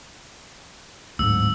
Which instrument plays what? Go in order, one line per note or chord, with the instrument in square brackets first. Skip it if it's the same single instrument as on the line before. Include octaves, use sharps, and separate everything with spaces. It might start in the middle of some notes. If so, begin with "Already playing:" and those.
[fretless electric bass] D1 G#2 [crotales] E6